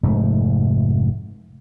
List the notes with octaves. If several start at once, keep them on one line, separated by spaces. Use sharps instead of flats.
F1 G#2 A3